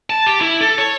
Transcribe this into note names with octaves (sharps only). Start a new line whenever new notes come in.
A5
G4
E4
A4
C#5